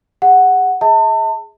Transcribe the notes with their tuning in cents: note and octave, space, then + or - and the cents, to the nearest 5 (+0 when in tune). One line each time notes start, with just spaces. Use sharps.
G#4 -40 F#5 +0
G#4 +0 E5 -45 A5 +35